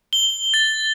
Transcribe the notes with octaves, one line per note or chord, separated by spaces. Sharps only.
G7
A6